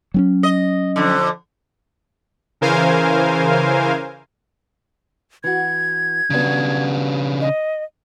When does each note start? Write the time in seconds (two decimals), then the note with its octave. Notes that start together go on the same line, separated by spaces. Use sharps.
0.14 F#3 C4 C#4
0.43 D#5
0.96 F2 D3
2.61 C#3 E3 A#4 C5 F5 G#5
5.44 E3 F#4 G#6
6.30 C#3 F#3 G3 B3 D4
7.41 D#5